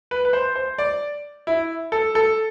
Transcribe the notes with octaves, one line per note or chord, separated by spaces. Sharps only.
B4
B4
C5
C5
D5
E4
A4
A4